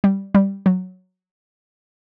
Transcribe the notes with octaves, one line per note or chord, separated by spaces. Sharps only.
G3
G3
F#3